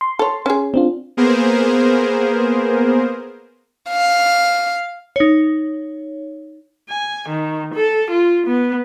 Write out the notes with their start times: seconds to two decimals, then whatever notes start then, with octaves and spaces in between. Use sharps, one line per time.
0.01 C6
0.19 A4 C#5
0.46 C#4 G#4
0.74 C4 D4 F4
1.17 A#3 B3 G#4 A#4 C5
3.89 F5
5.16 D#4 C#5
6.90 G#5
7.29 D#3
7.75 A4
8.11 F4
8.47 B3